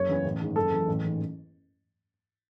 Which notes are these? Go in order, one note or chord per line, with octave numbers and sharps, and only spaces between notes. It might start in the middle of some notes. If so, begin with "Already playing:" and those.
Already playing: F#1 C#5
E2 C#3 E3
A1
G#2 D#3
F#1 A4
F#2 E3
A1
G#2 E3